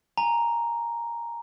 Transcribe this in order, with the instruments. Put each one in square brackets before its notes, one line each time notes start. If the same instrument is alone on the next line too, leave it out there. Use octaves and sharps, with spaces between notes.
[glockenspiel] G#5 A#5